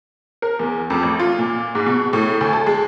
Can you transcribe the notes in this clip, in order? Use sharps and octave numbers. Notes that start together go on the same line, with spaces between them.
A#4
E2
F2
A1
F4
A#2
G#2
B2
A2
D2
A4
G#3